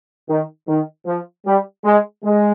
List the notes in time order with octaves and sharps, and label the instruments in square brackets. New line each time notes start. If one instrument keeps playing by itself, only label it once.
[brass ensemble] D#3
D#3
F3
G3
G#3
G#3